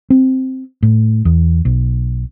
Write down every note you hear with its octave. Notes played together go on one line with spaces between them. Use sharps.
C4
A2
E2
B1